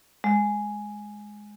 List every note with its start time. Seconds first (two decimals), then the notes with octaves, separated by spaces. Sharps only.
0.24 G#3